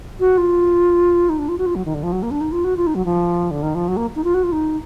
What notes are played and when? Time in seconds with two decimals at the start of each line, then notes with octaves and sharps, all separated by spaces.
0.20 F#4
0.38 F4
1.29 D#4
1.39 D4
1.49 F4
1.58 F#4
1.66 F4
1.76 F#3
1.85 D#3
1.94 D3
2.03 F3
2.12 F#3
2.23 A#3
2.31 D4
2.41 D#4
2.52 F4
2.64 F#4
2.77 F4
2.87 D#4
2.95 F#3
3.05 F3
3.51 D3
3.63 D#3
3.75 F3
3.88 F#3
3.97 A#3
4.16 D#4
4.24 F4
4.34 F#4
4.43 F4
4.52 D#4